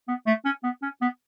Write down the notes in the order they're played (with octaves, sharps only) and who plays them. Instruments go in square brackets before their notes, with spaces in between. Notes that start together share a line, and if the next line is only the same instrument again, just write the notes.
[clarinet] B3
A3
C#4
B3
C#4
B3